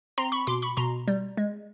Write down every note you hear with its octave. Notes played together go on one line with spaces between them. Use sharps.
C4 A#5 C6
B5 C#6
B2 C6 D6
B5 C#6
B2 A#5 C6
G3
G#3